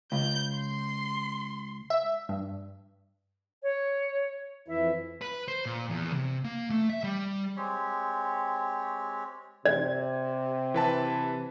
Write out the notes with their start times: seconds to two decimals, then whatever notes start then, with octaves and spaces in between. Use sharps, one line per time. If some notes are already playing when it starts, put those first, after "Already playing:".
0.12 C#2 G6
0.56 C6
1.90 E5
2.29 G2
3.63 C#5
4.68 F2 E3 E4 E5
5.22 B4
5.48 C5
5.66 A#2
5.90 E2
6.13 C3
6.44 A#3
6.70 A3
6.90 E5
7.04 G3
7.57 G#3 C4 G4 C#5
9.66 C3 D5 G#6
10.74 E3 B4 A5